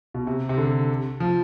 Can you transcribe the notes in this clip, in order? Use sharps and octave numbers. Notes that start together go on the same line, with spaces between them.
B2
C3
C3
D3
F3